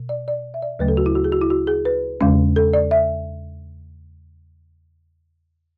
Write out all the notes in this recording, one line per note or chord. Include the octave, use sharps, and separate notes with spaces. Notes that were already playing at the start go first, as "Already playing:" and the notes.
Already playing: B2
D5
D5
E5
D5
D2 C#3 F#3 A3 C#4 B4
A4
F#4
E4
F#4
G#4
F#4
E4
F#4
G#4
B4
E2 C#3 G#3 C#4
A4
D5
E5